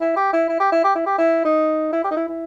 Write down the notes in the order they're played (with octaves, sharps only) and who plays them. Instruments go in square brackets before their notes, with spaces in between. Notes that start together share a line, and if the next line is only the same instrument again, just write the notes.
[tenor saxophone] E4
G4
E4
E4
G4
E4
G4
E4
G4
E4
D#4
E4
G4
D#4
E4
E4